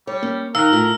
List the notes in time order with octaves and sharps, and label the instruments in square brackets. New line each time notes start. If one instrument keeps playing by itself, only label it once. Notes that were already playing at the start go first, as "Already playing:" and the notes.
[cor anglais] G3 [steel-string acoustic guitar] C#5
[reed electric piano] A#3 [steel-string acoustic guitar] C#4
[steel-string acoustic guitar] D#3 [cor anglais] A#4 [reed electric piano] F5 F#6 [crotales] E6
[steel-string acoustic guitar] A2 [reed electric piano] F4